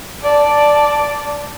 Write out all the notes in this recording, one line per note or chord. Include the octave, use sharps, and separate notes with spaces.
D5 A5